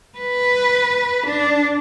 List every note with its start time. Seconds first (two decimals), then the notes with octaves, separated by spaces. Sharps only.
0.18 B4
1.26 D4